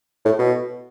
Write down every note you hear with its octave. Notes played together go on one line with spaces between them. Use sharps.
A2
B2